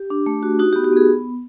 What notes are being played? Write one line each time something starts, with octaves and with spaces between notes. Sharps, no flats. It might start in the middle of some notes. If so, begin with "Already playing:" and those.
Already playing: G4
D4
A3
F#4
D#4 F#4
G4
B3
G4
B3 G#4